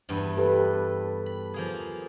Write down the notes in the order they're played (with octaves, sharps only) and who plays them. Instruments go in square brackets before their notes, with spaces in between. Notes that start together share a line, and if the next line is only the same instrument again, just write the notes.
[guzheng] E2 G2
[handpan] G4 A4 B4
[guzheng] B5
F3 A#3 G#4